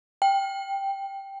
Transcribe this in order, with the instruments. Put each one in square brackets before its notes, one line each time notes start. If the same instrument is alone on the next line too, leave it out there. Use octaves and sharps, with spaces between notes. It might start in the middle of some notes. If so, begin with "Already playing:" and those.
[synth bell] G5